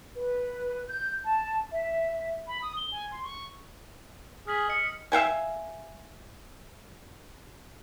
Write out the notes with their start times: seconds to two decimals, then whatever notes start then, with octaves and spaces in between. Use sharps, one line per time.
0.16 B4
0.88 G6
1.24 A5
1.72 E5
2.47 B5
2.62 D#6
2.77 G7
2.92 G#5
3.12 C6
3.24 C#6
4.47 G#4 F6 B6 F#7
4.69 D#5 E6 C#7
5.12 E5 F5 G5 G#5